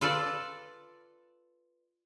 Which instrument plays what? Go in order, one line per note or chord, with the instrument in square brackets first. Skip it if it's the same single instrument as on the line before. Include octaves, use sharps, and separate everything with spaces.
[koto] F4 A4 B4 D5